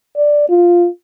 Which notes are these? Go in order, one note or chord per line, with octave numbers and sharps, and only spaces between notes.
D5
F4